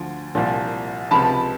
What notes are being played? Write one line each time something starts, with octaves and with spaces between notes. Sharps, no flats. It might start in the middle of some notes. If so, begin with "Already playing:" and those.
Already playing: D2 D3 F3
C2 A#2 F3
C#2 C3 F3 A5 B5